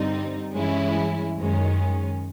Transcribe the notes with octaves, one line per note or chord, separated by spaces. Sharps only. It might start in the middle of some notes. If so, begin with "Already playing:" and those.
Already playing: G2 D3 G3 C4 D#4
G2 E3 G#3 C#4 E4
F#2 D#3 G#3 C#4